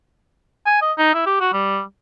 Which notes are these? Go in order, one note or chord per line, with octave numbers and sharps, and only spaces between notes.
G#5
D#5
D#4
E4
G4
F#4
G3